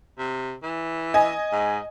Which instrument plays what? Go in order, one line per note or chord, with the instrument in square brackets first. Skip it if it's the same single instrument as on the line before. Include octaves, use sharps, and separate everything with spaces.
[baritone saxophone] C3
E3
[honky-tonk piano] D#5 G#5
[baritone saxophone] G#2